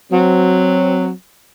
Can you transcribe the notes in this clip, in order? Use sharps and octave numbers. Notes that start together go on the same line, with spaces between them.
F#3 C4